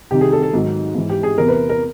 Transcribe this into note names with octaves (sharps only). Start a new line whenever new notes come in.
C2 C3 D#3 G4
G#4
A4
A4
G#2 D#3 F#3
G#2 E3
G4
G#4
E2 C3 E3 A#4
B4
A#4